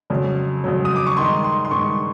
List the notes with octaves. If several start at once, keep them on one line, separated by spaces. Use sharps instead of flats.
F2 C#3 F#3
F2 C#3 F#3
D#6
D6
C#6
G2 D#3 G#3 C6
C6
C6
G2 D#3 G#3 C#6